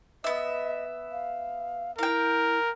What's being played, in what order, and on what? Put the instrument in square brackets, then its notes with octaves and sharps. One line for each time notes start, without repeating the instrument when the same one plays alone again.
[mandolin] B3 E5 [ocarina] D#5
[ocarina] F5
[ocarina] E4 [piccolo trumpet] A#4 [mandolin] F5 G5